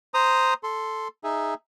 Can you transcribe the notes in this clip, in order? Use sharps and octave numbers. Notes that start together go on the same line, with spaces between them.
C5 A#5 D#6
A4 C6
D#4 G#4 E5